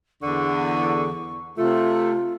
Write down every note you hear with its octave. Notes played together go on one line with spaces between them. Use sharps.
E2 D3 C#6
C3 A3 F4